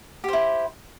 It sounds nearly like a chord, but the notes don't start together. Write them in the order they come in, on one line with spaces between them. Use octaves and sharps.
G4 C5 E4